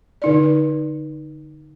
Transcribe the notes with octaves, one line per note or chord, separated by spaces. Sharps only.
D3 D#4 D5